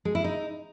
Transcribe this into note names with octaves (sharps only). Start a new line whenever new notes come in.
G#3
E4
D#4